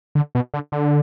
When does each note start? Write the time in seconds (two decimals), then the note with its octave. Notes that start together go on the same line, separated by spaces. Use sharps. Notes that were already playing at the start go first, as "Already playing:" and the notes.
0.15 D3
0.35 B2
0.54 D3
0.72 D3